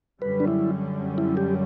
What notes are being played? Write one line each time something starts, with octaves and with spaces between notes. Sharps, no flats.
F#2 D3 G3 C#4 B4
D4
E4
E4
G4